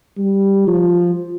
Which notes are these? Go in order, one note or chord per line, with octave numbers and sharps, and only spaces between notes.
G3
F3